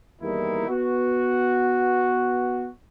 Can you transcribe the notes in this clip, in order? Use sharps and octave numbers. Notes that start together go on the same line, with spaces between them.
E2 D#3 G3 A#3 D#4 E4
B3 F#4